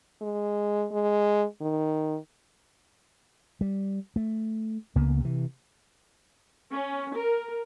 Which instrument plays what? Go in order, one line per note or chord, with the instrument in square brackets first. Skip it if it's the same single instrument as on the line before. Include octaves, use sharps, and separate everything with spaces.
[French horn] G#3
G#3
D#3
[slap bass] G3
A3
C#2 C#3 A#3 B3
C3 E3
[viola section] C#4
A#4